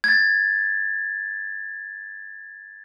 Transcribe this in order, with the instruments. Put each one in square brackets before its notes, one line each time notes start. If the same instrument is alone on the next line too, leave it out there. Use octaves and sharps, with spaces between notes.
[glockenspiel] G#6 A6